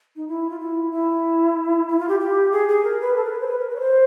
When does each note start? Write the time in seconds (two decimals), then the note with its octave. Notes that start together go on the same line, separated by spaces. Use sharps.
0.16 D#4
0.28 E4
0.50 F4
0.60 E4
0.92 E4
1.88 E4
1.99 F4
2.09 G4
2.20 G4
2.52 G#4
2.69 G#4
2.84 A#4
3.01 B4
3.16 A4
3.24 A#4
3.32 B4
3.40 C5
3.48 B4
3.59 A#4
3.70 B4
3.76 C#5
3.80 C5